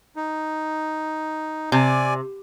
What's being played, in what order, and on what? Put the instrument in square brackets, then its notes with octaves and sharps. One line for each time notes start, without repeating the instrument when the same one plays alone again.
[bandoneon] D#4
[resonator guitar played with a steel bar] C3 [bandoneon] D5 G#5